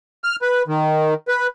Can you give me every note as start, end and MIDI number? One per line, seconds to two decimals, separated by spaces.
0.24 0.36 89
0.42 0.62 71
0.68 1.14 51
1.28 1.47 71